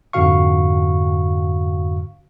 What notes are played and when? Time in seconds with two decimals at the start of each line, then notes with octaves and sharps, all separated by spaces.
0.13 F2 G#2 D3 F#4 F5 C#6